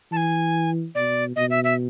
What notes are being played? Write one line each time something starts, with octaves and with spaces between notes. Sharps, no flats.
E3 G#5 A5
B2 D5
B2 D#5
E5
E5